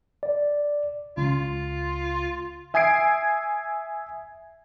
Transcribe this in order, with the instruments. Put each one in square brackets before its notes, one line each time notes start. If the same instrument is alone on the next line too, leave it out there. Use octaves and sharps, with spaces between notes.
[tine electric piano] D5
[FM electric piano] C#2 [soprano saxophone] F4
[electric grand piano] E5 G#5 D#6 G#6 C7 D7